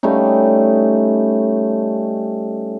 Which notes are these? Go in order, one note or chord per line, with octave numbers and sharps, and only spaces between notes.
G3 A3 C#4 D#4